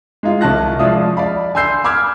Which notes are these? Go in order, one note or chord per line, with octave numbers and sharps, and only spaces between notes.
G#3 D#4 F4
C2 C#4 A5 F#6 A#6
F3 G#3 D5 E5 F5 D#6
D5 F5 B5
G#5 C6 E6 G6 C7
B5 D6 E6 F6 G#6